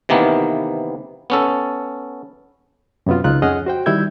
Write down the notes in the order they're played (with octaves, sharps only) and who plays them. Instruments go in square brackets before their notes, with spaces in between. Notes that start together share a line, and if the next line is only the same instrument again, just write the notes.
[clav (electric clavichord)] C3 D#3 E3 A#3 B3
B3 C#4 A4
[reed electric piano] F#2 C3 B3 C4 F4
C#2 D#4 F4 F#6
F2 C#4 G#4 D#5 F#5 F6
F#4 C5 G5
D#3 G3 E4 E6 G6 G#6